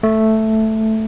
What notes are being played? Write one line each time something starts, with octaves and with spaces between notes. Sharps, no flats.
A3